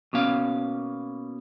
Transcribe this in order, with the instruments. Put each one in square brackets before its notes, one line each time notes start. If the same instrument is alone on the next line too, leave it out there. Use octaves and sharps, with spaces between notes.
[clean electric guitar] B2 A#3 C#4 F5